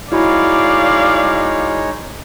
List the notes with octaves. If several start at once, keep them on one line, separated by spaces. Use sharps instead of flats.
G#3 D#4 E4 F#4 C#5 D5 F5 B5